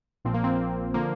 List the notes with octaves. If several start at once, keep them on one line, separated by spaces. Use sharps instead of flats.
A#1 A#2 F3 C4
A#3
C4
D3 F3 A#3